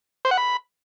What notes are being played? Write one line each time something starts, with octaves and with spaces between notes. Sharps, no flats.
C5
F#5
B5